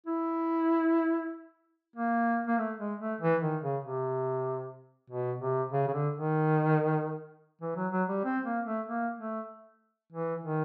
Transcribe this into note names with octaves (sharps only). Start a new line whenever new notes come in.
E4
A#3
A#3
A3
G#3
A3
E3
D#3
C#3
C3
B2
C3
C#3
C#3
D3
D#3
E3
F#3
F#3
G3
C4
A#3
A3
A#3
A3
E3
D#3